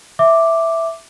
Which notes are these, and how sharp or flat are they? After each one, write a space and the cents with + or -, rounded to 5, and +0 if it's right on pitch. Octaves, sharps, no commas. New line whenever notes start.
E5 +0 D6 +0